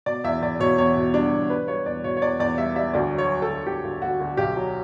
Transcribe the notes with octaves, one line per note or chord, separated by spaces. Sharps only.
B2 D5
E2 E5
E2 D5
B2 C#5
E2 C#5
B2
G3 D4
E2
G3 B4
G3 C#5
E2 D5
B2 C#5
C#5
E2 D5
E2 D5
G3 E5
G3 E5
D2 D5
F#3
C#5
F#3
A4
D2
D2 G4
D2
D2 F#4
D2
B1 G4
F#3